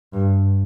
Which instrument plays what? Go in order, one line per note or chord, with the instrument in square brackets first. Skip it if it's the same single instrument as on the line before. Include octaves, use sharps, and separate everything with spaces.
[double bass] G2